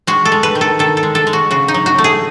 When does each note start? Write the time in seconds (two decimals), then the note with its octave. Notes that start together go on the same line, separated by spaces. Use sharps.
0.07 G#3 F#4
0.25 A4
0.32 G#3
0.43 B4
0.55 D#3
0.61 A4
0.79 D#3 A4
0.97 A4
1.03 G#3
1.15 A4
1.27 G#3
1.33 F#4
1.51 C#3 F#4
1.68 D#4
1.74 F#3
1.86 F#4
1.98 A3
2.04 G#4